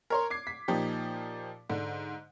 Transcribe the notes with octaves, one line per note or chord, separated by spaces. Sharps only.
A#4 C#5 C6
D6 G#6 C7
B6
A#2 F3 D#4 G4
G#2 D3